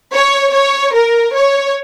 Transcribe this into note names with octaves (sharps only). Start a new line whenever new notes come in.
C#5
C#5
A#4
C#5